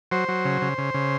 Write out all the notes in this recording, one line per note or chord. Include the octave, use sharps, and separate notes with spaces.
F#3 C5
F#3
C#3
C#3
C#3
C#3